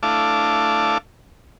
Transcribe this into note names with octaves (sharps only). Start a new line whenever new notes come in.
A3 D4 E4 F5 A5 D6